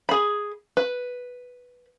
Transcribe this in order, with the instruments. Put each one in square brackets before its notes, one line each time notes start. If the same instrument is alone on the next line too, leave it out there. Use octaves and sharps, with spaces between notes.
[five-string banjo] G#4 B5
B4